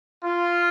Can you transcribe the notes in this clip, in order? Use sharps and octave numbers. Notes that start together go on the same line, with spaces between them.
F4